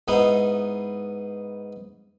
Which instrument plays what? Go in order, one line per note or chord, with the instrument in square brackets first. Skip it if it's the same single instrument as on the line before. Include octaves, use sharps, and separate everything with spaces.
[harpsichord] G#2 B3 D#4 E4